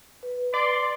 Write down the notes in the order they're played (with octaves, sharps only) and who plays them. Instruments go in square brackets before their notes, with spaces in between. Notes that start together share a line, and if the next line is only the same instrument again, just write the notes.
[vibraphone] B4
[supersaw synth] D5 [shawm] C6